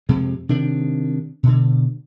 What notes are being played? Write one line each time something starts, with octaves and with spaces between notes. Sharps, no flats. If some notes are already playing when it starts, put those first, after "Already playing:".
F2 C3 G#3
C3 D#3 D4
B2 D3